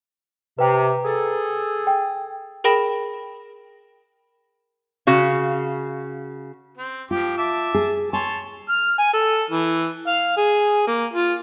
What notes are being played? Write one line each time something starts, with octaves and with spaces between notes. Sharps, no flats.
C3 B4 G5 A#5
G#4 A4
G5
G#4 A#4 G5 B5 A#6 E7
C#3 F#4 F5
C4
F3 F4 G4
E5 A5 D6
G#4
C#5 G#5 A5 C6
F6
G#5
A4
E3
F5
G#4
A#3
F4